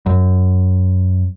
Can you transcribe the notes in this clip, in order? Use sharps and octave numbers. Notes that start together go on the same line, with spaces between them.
F#2